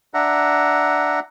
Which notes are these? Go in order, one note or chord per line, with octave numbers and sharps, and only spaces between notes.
D4 E5 F#5 A#5